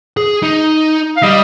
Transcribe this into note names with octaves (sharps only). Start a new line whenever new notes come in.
G#4
D#4
F5
G3 D#5